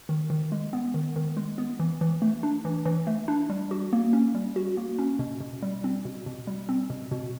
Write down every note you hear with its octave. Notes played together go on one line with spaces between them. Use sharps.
D#3
D#3
G#3
B3
D#3
D#3
G#3
B3
E3
E3
A3
D4
E3
E3
A3
D4
G3
F#4
A#3
C#4
G3
F#4
A#3
C#4
B2
B2
G3
C4
B2
B2
G3
C4
B2
B2